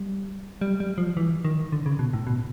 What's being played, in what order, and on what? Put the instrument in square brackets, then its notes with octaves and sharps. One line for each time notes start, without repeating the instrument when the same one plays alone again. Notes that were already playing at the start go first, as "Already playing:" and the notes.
Already playing: [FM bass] G3
G3
G3
F3
E3
D#3
D3
C#3
B2
A2
B2